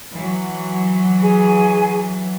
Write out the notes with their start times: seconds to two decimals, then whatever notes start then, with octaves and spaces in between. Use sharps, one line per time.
0.12 E3 F#3
1.21 G#4 G#5